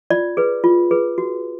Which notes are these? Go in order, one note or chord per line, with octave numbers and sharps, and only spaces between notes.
F4 D5
G#4 B4
F4
G#4 B4
F#4